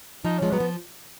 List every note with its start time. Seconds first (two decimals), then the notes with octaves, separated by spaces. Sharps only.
0.25 F3 D#4
0.39 F3 G#3 C#4
0.52 F#3 B3
0.60 F3